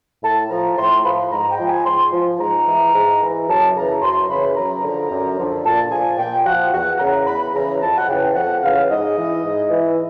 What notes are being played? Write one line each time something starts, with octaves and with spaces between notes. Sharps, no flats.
A2 A5
F3 A#5
A2 C6
F3 B5
G#2 A#5
G5
F3
G#5
G#2 C6
F3
G#2 A#5
E3
G#2
E3
F#2 A5
C#3 E3 A#5
F#2 C6
C#3 E3 B5
F#2 A#5
D3 F3
F#2
D3 F3
A#2 A5
F3 G#5
A#2 G5
F3 F#5
E2 F#5
C#3 E3 A#5
E2 B5
C#3 E3 A#5
F2 A5
F#5
C#3 E3 G5
F2 F#5
C#3 E3 F5
G#2 D#5
E3
G#2
E3